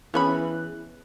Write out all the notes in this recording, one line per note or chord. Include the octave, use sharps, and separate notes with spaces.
E3 B3 C#4 E4 G#4 B5 F#6